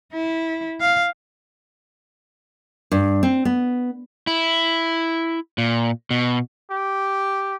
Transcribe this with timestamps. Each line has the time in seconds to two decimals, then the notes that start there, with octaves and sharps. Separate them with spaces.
0.13 E4
0.81 F5
2.92 G2
3.23 C4
3.45 B3
4.27 E4
5.58 A#2
6.11 B2
6.71 G4